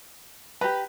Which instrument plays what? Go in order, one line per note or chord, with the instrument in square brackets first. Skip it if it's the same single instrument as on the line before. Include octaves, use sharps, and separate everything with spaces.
[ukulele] G4 A#5 [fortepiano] B4